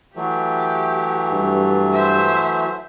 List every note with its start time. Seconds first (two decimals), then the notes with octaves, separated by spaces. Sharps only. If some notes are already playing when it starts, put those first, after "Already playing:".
0.16 E3 F#3 A3 G4
1.31 G2
1.93 C5 E5